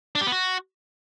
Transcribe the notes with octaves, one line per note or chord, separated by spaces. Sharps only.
D4
G4
B3
F#4